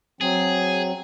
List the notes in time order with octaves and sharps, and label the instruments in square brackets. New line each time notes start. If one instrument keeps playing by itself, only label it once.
[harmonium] F#3 C4 [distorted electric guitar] G#4